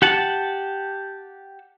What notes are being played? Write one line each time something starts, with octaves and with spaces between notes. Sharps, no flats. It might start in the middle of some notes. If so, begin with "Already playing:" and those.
G4 F#5 A5